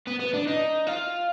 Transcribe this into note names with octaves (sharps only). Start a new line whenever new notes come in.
B3
B3
D4
D#4
F4